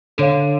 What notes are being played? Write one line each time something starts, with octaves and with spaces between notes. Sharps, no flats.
D3 A4 C#5 F5